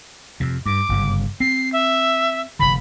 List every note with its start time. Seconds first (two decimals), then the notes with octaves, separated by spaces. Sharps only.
0.40 F2 C3
0.66 G2 D6
0.89 G1 F#2 C#3
1.40 C4 C7
1.73 E5
2.59 F1 D3 B5